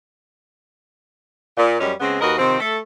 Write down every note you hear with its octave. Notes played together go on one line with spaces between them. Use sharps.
A#2
F#2 G3 G#3 C#4
C#3 G#3 B3 C4
D#2 F#4 A#4 B4 D#5
C3 D#3 F3 C4
A3 A4